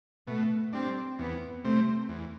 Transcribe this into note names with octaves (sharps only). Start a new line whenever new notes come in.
B2 A3
G3 C4 D4
E2 B3
C3 G3 A3 C4
E2